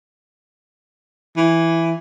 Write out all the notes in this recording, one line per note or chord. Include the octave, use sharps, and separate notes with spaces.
E3